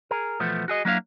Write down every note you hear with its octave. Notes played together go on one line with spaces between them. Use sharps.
G#4 A#4
E2 B2 F3 A3 B3
F#4 G#4 D#5
F#3 A#3 D4 E4 E5 F5